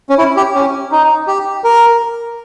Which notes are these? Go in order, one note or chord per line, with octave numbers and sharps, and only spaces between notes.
C#4
E4
G4
C#4
D#4
G4
A#4